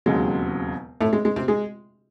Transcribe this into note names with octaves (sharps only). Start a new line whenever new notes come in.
E1 D#2 C#3 F#3 G#3 C4
A2 A3
G#3
G#3
C3 C4
G#3 G#4